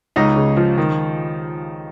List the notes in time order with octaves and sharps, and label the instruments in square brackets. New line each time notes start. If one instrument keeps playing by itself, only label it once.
[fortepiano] C#2 D#4 D#5
C#3
F3
D#3